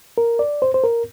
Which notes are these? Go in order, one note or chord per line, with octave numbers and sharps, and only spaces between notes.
A#4
D5
C5
C5
A#4